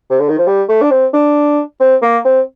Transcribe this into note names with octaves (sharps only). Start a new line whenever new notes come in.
C3
D3
D#3
F3
G3
A3
D4
C4
D4
C4
A#3
C4